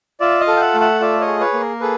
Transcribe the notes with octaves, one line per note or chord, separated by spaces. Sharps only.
F4 D5 E5
D#5 F5
A4
G5
E5 F#5
A3
E5 F#5
F4 D5 E5
C#5 D#5
G#4
B4 C#5
A#3
A#4
G#4 A4 B4